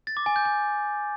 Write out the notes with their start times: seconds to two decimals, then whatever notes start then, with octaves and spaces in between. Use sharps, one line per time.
0.07 A6
0.17 D6
0.26 G#5
0.36 G6
0.45 G#5